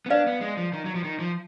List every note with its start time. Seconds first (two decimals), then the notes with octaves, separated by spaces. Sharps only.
0.06 B3
0.10 D4 B4 D5 F5
0.27 B3
0.41 G#3
0.57 F3
0.73 D#3
0.85 F#3
0.95 F3
1.04 D#3
1.19 F3